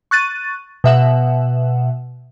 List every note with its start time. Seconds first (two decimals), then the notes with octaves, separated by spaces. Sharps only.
0.11 C#6 F#6 A6 D#7
0.84 B2 E5 F#5